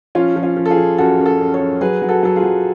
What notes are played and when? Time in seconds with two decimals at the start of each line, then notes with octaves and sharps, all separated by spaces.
0.15 F3 C#4 F4
0.36 F3
0.43 C#4 F4
0.57 F3
0.66 A4
0.70 F4 G#4
0.77 F3
0.98 F#2 F#4 A4
1.19 F#2
1.26 F#4 A4
1.40 F#2
1.54 A4 C#5
1.60 F#2
1.81 F#3 G#4 B4
2.02 F#3
2.09 F#4 A4
2.23 F#3 A4
2.36 F4 G#4
2.43 F#3